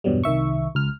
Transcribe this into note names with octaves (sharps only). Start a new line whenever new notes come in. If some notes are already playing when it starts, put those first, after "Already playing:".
E2 G2 B2 F#3 G3
C2 D#3 E5 C#6
C#2 F6